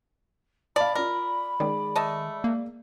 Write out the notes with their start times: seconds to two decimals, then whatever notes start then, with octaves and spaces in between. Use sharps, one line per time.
0.76 D5 F5 A5 B5
0.95 F4 A#4 D5
1.60 D#3 G#3 D5
1.96 A3 D#5 A5
2.44 A#3